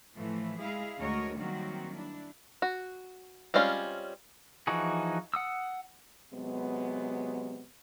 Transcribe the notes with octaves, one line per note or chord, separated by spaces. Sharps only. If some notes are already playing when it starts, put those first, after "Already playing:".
A2 E3 F3 A3
G#3 E4 G#4 F5
D2 G#3 F#4 A#4 C#5 D#5
D#3 F#3 G3 A#3 C4 F#4
D4 E4
F#4
G3 G#3 C4 C#4 F4
E3 F3 D#4 F#4 G#4
F#5 D#6 E6
C3 F#3 G#3 B3